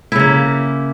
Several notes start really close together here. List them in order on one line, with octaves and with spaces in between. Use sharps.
E4 C#3 A#3